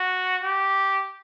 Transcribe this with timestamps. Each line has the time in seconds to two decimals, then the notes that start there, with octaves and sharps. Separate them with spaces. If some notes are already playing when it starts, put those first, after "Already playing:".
Already playing: F#4
0.43 G4